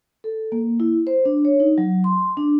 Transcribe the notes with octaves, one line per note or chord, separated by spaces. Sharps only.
A4
A#3
E4
C5
D4
C#5
D#4
F#3
C6
D4